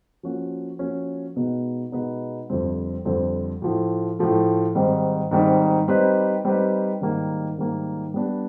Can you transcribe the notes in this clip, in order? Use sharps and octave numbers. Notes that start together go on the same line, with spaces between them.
F3 A#3 C#4 F#4
F3 A#3 C#4 F#4
B2 G#3 B3 D#4 F#4
B2 G#3 B3 D#4 F#4
F2 D3 G3 C4
F2 D3 G3 C4
A2 F3 A3
A2 F3 A3
G#2 D#3 G3 C4
G#2 D#3 G3 C4
G3 C4 D#4 G4 B4
G3 C4 D#4 G4 B4
G#2 D#3 G3 A#3
G#2 D#3 G3 A#3
G3 B3 D4 G4